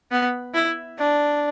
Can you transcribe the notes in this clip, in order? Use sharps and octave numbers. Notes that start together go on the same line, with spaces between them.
B3
E4
D4